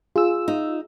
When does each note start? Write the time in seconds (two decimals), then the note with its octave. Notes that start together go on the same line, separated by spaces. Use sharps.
0.16 F4 G#4 E6
0.48 D#4